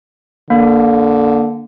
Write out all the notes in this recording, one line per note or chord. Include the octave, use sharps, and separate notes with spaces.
D3 A#3